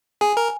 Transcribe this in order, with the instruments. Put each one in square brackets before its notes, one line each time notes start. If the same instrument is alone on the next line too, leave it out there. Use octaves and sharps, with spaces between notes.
[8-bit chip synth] G#4 [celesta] G#5
[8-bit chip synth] A#4